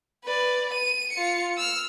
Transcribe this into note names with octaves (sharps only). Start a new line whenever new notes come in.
B4 D5
D#7
F4 C#7
E6 F6